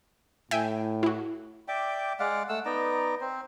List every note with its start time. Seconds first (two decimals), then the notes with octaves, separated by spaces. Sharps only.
0.51 A2 E5 G5 G#5
1.03 E4 F#4
1.68 D5 E5 G5 D6
2.19 G#3 D5 F5 F#5
2.49 A3 F#5 E6
2.65 B3 D#4 D5 A#5
3.21 C4 C5